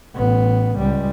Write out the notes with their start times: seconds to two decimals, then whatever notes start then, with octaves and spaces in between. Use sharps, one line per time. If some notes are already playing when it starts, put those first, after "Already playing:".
0.15 A1 B3
0.77 C#2 G3